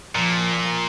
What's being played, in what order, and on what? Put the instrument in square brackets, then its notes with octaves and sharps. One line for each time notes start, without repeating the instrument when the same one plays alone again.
[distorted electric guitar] A#2 [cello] F3